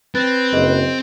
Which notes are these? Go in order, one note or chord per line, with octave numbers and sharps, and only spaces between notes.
C4 B4 A6
F#1 G#4 D#5 F#7